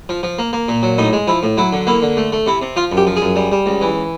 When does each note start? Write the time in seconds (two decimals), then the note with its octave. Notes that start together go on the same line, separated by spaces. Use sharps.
0.09 F3
0.23 F3
0.39 A#3
0.53 A#3
0.69 A#2
0.83 F#3
0.98 A2 D#4
1.13 G#3
1.27 F3 E4
1.43 A2
1.57 F#3 E4
1.73 D3
1.87 A#3 E4
2.02 D3
2.17 A3
2.32 A3
2.46 C3 E4
2.62 C3
2.76 F3 F4
2.92 F#2
2.97 G4
3.07 F3
3.17 G#4
3.22 F#2
3.36 G3
3.52 G3
3.66 C#2
3.81 E3